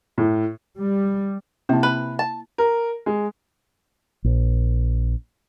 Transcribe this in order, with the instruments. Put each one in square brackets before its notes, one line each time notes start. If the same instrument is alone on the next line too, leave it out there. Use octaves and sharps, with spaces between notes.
[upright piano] A2
[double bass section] G3
[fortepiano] C3 A5 [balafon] A#3 E4
[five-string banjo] B4
A5
[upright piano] A#4
G#3
[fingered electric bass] A#1